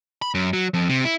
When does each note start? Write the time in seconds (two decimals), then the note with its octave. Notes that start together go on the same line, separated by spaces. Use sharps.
0.22 B5
0.34 F#2
0.53 F#3
0.74 F2
0.89 C3
1.05 E4